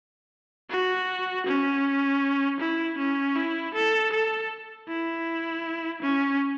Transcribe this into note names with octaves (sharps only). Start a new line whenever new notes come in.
F#4
C#4
E4
C#4
E4
A4
A4
E4
C#4